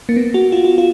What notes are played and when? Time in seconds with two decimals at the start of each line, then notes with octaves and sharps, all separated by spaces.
0.09 A#3
0.16 B3
0.34 F#4
0.52 F4
0.65 F#4
0.78 F4